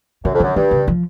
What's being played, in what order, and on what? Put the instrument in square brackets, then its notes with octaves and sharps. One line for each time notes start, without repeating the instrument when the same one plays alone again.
[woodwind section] F#2 [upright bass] C#3
[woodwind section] F2
[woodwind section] F#2 [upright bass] D3
[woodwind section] G2 [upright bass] D#3
[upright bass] C#3
F3